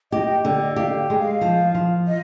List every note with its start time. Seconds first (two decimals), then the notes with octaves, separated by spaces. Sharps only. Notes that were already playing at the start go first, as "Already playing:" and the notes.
0.12 G4 D#5
0.28 G5
0.44 D3 G5
0.61 D#5
0.76 G4 F5
0.98 G5
1.10 G#3
1.20 F5
1.41 F3
1.75 F3
2.08 D#5